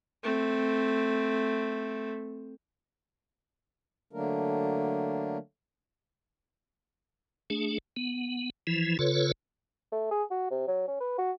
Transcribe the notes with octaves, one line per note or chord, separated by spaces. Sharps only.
A3 C4
D3 F#3 A3 A#3 D4 A#4
A3 D4 G#4
B3
E3 F3 E4
C#3 F4 A4 B4 C#5
A3
G#4
F#4
C3
F#3
C#4
B4
F#4